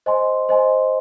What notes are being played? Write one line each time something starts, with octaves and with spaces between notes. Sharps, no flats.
C5 D#5 G#5 C6
C5 D#5 G#5 C6